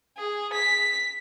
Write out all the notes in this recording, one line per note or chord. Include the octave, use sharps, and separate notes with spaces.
G#4
B6